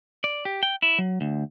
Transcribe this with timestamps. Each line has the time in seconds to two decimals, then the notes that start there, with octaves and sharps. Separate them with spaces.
0.24 D5
0.45 G4
0.63 G5
0.82 E4
0.98 F#3
1.21 D2